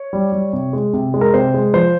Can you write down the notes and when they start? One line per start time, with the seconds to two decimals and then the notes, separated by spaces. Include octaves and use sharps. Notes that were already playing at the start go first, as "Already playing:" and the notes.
Already playing: C#5
0.13 G3
0.32 G3
0.53 C3
0.73 G#3
0.93 C3
1.14 G#3
1.21 A#4
1.34 C3 C5
1.54 G#3
1.73 F3 C5